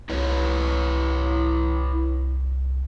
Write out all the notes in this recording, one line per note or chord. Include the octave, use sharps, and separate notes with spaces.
C2 E4 B4 C#5